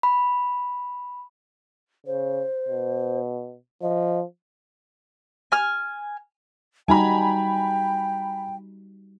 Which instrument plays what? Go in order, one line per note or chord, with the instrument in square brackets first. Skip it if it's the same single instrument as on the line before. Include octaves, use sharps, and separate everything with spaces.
[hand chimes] B5
[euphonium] C#3 [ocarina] C5
[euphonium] B2
[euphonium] F3 [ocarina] D#5
[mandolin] G#5 F6
[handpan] G3 D#4 F#4 [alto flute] G5 [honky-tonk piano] G#5 A#5 B5